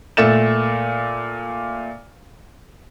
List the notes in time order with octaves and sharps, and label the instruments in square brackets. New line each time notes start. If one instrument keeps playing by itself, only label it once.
[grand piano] A#2 A3 A6 E7